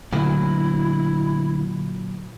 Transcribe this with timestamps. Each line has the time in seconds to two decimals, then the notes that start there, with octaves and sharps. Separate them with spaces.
0.13 D2 A#2 F#3 E4